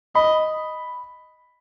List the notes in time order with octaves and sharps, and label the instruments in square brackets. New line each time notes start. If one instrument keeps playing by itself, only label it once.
[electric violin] D#5 [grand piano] B5